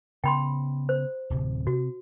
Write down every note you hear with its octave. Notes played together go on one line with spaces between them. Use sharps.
C#3 B3 G5 B5 C6
C5
D1 C3
C3 F#4